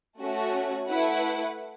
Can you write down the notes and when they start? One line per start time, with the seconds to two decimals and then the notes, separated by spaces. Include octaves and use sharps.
0.20 A3 C#4 F#4
0.88 A3 E4 B4 F#5